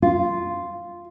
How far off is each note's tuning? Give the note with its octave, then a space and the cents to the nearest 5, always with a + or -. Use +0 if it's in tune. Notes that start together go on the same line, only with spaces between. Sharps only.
F4 -5